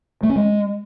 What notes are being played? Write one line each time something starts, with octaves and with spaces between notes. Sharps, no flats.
A3
C#4
G#3